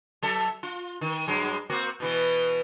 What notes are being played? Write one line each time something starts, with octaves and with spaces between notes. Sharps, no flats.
F#3 A4 E5
F4
D#3
G2 F#3 G#3
A#3 C4 F#4
B2 E3 B3